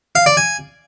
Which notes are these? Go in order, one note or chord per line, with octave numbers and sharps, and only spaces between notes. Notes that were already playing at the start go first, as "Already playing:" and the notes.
F5
D5
G#5